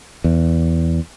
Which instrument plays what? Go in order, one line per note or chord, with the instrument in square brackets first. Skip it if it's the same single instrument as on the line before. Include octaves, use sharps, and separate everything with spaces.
[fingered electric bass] E2